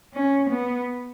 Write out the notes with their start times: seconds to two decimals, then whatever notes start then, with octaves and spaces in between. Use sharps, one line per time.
0.14 C#4
0.50 B3